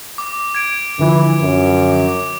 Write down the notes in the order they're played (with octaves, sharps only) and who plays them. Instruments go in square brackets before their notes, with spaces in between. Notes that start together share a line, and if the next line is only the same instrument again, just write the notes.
[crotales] D6
G#6 D7
[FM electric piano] D3 F3 [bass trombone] E3
[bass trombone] F#2
[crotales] D6